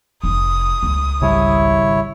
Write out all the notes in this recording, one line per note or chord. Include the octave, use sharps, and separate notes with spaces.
F1 D#6
C#2
G#1 C#3 G3 E4 C#5